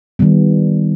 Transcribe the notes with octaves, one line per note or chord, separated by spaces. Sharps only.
D#3 G3 B3